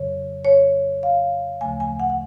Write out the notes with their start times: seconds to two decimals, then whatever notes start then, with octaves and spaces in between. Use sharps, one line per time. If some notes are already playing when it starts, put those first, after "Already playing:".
Already playing: F2 C#3 F#3 C#5
0.45 C#5
1.03 F5
1.61 D2 C#3 F3 A3 G#5
1.80 G#5
2.00 F#5
2.10 F#5